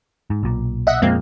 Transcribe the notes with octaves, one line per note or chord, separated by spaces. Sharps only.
G#2
B1 A#2
D#5 E5 F#5
F2 A#2 G#3 A#3 C4